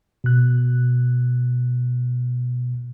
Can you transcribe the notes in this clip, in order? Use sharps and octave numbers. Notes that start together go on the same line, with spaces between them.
B2 F#6